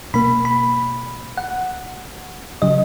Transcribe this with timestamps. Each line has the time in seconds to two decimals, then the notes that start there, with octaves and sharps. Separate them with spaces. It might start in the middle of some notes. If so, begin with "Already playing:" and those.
0.14 B2 A#3 B5
0.45 B5
1.37 F#5
2.62 C#3 F#3 D#5